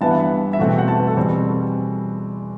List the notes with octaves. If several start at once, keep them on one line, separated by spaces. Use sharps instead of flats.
G2 E3 B3 E4 A5
F#5
B5
E5
E2 B2 A3 C4 F#5
G5
F#5
A5
B4
A4
E2 B2 G3 C4